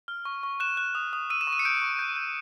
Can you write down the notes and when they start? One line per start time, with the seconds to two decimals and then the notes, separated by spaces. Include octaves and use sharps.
0.08 F6
0.25 C#6
0.43 C#6
0.60 F#6 E7
0.77 F#6
0.95 D#6
1.13 D#6
1.30 E6 D#7
1.41 E7
1.47 C#6
1.53 D#7
1.59 C#7
1.65 G6 D7
1.82 C#6
1.99 G6
2.17 G6